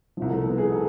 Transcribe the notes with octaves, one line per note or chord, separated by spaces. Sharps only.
C2 C3 F3
A3
B3
G#4
A4